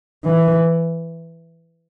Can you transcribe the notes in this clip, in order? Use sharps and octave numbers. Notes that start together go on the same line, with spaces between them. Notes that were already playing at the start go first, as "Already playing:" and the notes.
E3